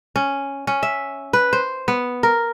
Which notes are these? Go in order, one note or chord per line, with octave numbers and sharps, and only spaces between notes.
C#4
C#4
E5
B4
C5
B3
A#4